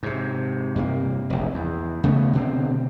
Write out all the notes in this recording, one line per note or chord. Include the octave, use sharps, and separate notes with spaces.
G#2 C3
G2 C3 A#3
F1 A#1
E2
C#3 A3 B3
B2 D3 C4